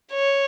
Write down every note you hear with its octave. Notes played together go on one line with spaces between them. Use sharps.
C#5